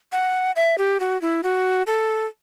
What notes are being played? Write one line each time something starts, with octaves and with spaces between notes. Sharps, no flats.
F#5
E5
G4
F#4
E4
F#4
A4